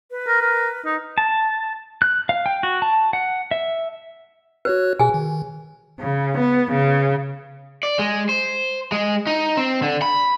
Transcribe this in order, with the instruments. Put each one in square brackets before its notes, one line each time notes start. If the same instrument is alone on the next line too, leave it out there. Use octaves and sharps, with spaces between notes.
[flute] B4
[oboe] A#4
A#4
D#4
[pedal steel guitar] A5
F#6
F5
G5
F#4
A5
F#5
E5
[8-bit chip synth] F#4 C#5 F#6 [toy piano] B4
[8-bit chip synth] B2 [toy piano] G#4 G#5
[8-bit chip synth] D#3
[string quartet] C#3
B3
C#3
[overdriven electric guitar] D5
G#3
C5
G#3
D#4
C4
D3
B5